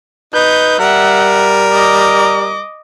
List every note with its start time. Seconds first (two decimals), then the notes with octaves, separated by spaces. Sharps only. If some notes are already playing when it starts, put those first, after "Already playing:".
0.34 D#4 B4 G6
0.79 G3 A#4 E5 F#5
1.74 D#5 D6